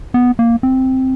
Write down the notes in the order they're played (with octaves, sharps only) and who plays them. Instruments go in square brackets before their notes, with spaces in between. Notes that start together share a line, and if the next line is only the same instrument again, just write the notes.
[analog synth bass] B3
A#3
C4